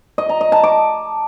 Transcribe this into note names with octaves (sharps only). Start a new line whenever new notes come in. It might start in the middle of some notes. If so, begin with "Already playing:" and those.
D#5
A#5
D#5
A5
D6